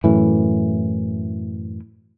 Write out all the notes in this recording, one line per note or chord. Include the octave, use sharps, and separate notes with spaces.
F#2 A2 E3